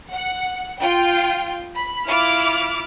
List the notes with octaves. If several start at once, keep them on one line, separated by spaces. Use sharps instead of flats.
F#5
F4 G5
B5
E4 F4 D6 F6